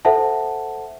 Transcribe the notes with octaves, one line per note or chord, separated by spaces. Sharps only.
A4 C5 E5 F#5 A5